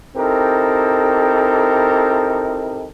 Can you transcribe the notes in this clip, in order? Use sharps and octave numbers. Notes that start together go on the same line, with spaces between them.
C4 D#4 E4 G4 A4 A#4